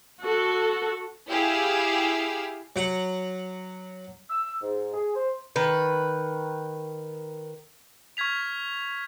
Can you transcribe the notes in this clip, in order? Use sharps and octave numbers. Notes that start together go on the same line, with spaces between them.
F#4 A4
E4 G4 G#4 F5 E6
F#3 F#5
E6
G#2
G#4
C5
D#3 B4
C#6 F6 G#6 B6 F7